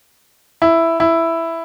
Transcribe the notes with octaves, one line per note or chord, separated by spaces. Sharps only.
E4
E4